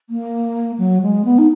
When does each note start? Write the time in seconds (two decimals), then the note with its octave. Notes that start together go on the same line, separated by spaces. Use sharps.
0.10 A#3
0.78 F#3
1.02 G#3
1.25 B3
1.39 D#4